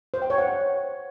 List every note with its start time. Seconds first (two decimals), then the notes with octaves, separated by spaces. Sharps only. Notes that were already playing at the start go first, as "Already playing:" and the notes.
0.14 C5
0.22 G5
0.30 C#5
0.38 F#5